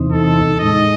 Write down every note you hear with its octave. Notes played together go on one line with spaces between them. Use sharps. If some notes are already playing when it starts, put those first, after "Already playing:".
Already playing: E2 C3 E3 C4 D#4
A4
A2 G#3 D#4 D#5